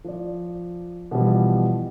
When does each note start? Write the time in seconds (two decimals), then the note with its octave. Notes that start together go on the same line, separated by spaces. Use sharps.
0.04 F3 D5
1.11 B2 E3 F3 G3